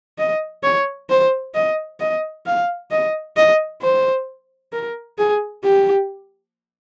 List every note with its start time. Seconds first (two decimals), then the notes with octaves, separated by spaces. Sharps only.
0.18 D#5
0.63 C#5
1.10 C5
1.55 D#5
2.00 D#5
2.46 F5
2.91 D#5
3.37 D#5
3.82 C5
4.73 A#4
5.18 G#4
5.64 G4